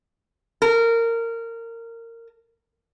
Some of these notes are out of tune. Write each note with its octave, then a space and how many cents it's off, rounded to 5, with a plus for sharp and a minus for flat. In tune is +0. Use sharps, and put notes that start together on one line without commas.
A#4 -20